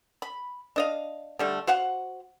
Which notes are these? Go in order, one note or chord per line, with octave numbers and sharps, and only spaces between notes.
B5
D4 D#5 F5
D3 G3 A3
F#4 C5 F5 F#5